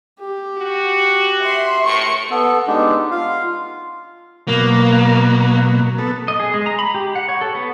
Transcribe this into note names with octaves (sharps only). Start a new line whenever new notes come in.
G4
F#4
E5 C6
A2 C#6 C#7
B3 A4
G#3 B3 D4 D#4 G4
F4 F5
B2 F#3 A#3
B3 A4
D#5
G#4
G#3
A#5
B5
G4
F#5
C#5
A4
B3